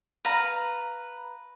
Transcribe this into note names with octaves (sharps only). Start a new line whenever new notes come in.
B4 F5 A#5